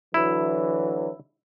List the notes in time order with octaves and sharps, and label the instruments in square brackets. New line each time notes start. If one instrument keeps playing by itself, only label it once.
[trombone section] D3 E3 F#3 [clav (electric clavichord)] E4